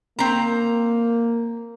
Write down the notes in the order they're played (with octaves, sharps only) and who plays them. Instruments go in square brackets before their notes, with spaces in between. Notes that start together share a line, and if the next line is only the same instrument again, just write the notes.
[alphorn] A#3 [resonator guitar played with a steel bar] C4 A#5